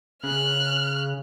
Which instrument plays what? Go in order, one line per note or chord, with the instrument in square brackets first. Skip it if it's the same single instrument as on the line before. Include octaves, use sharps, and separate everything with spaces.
[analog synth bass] C#3 [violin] F6 F#6